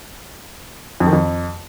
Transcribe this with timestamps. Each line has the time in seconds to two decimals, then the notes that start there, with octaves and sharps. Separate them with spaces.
1.00 F2
1.07 D#3
1.13 F2